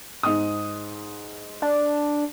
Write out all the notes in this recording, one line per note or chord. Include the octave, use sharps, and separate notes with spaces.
G#2 D#6
D4